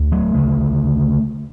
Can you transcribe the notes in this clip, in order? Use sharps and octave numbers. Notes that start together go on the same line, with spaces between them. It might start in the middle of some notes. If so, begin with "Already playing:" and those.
Already playing: D2
F#3 A3
D2 C#3